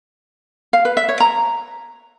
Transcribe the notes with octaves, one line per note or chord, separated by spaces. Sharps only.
F5
B4
E5
C#5
A#5